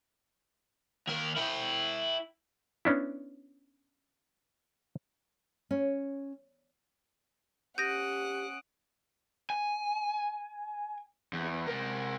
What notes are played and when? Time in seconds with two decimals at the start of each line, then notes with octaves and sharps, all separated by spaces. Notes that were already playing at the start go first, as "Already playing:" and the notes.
1.07 D#2 A#4
1.36 E4 G5
2.85 B3 C#4 D4 E4
5.71 C#4
7.78 C#4 G4 F#5 D#6 G6 A#6 D7 D#7
9.50 G#5
11.33 E2
11.67 C3 A#4